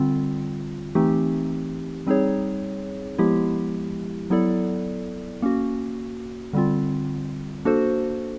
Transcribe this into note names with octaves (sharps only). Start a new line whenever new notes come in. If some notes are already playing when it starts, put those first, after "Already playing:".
Already playing: D3 G3 C4 F4
E3 A3 C4 D#4 G4
G3 C4 D#4 G#4 C#5
F3 G#3 B3 E4 G4
F#3 B3 E4 A4 D5
A#3 C#4 F#4
D3 G3 C4 F4
A#3 D4 F#4 A4 C5